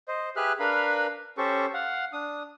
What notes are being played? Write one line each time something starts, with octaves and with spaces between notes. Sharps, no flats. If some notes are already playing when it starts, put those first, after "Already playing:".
C5 D#5
G4 G#4 B4 E5 F6 F#6
D4 A#4 B4 F5 B5
C#4 G4 A4 C5 C#6
F5 F#5
D4 D#6